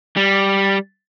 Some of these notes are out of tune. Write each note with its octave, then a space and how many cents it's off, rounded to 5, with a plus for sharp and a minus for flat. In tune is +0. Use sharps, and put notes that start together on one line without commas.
G3 +0